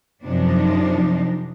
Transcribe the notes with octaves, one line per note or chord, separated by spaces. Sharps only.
F#2 C3 F3 D4 D#4